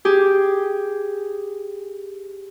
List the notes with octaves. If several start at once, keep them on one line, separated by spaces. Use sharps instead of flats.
G4 G#4